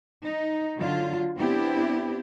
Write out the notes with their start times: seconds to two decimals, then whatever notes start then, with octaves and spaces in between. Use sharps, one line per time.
0.24 D#4
0.78 D3 F#3 F4
1.38 B3 C4 D4 E4 G4